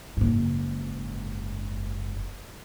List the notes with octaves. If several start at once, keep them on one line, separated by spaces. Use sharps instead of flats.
F#1 G#2